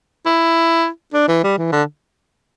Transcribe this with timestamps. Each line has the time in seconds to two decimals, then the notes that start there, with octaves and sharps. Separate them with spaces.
0.26 E4
1.14 D4
1.28 E3
1.44 G3
1.58 E3
1.72 D3